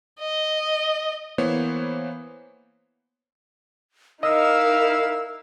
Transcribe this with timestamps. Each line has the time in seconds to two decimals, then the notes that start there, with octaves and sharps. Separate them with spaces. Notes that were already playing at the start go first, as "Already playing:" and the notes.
0.19 D#5
1.38 E3 A#3 B3 C5 C#5
4.23 D#4 E4 A#4 D#5 F5 E6